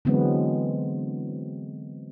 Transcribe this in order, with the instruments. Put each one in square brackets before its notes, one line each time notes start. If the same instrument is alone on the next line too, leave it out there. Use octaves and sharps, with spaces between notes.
[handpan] D3 E3 F#3 G#3 B3 C4